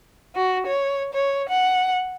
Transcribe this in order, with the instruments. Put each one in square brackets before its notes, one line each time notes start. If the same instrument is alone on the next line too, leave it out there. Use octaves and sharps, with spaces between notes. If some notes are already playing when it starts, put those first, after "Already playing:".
[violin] F#4
C#5
C#5
F#5